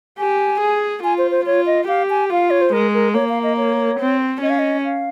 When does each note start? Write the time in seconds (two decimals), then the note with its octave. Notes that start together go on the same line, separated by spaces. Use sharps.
0.18 G4 G#5
0.61 G#4
1.03 F4 G#5
1.18 C5
1.31 C5
1.46 F4 C#5
1.66 D#5
1.88 G4 F5
2.10 G#5
2.30 F4 F5
2.51 C#5
2.61 C5
2.73 G#3 A#4
2.94 A#4
3.14 A#3 C#5
3.29 F5
3.43 D#5
3.57 C#5
4.00 C4
4.42 C#4 D#5
4.50 F5
4.59 D#5
4.85 F5